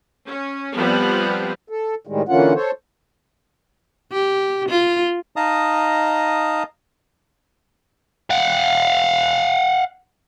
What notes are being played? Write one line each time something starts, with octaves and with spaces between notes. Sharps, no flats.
C#4
F3 G3 B3 C4
A4
A2 D#3 G3 G#3
D3 E3 A#3 C#4 F4 F#5
A4 C5 C#5
G4
F4
D#4 D#5 F5 A5 A#5 D#6
F5 F#5